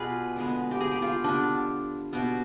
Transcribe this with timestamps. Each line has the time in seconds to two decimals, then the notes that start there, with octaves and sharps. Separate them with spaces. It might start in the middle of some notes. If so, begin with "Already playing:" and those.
Already playing: B2 G3 B3 F4 G#4 B4
0.36 D3 G#3 B3
0.71 G4
0.80 G#4
0.91 G4
1.02 F4
1.24 D3 G3 B3 D4
2.13 B2 G3 B3